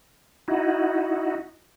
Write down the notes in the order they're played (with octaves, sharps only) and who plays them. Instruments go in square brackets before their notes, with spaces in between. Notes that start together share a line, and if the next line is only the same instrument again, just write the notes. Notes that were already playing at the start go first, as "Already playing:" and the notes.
[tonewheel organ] D#4 E4 F#4